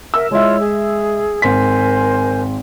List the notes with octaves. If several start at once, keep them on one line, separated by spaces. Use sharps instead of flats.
A#4 E5 E6
G#3 E4 F4 C#5 E5
G#4
G#1 A#4 C5 G#5 C6 B6